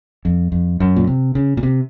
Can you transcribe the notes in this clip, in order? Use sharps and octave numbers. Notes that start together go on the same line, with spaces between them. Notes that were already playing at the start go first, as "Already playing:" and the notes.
F2
F2
F#2
A#2
C3
C#3
A#2
C3